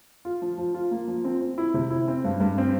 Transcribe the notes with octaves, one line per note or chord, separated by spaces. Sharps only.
F4
F3
F3
F4
A#3
F3
C4
C4
E4
C3
E4
C4
G2
G2
C4